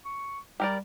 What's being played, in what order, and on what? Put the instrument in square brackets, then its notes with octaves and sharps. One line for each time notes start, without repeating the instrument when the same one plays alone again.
[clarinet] C#6
[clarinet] G3 [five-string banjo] G4 A#4 D5